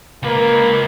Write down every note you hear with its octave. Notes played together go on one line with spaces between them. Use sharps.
C#2 A#3 B4